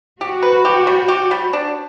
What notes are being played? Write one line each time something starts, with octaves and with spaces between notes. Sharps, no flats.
F#4 G4
B4
G4
G3
G4
G3
D4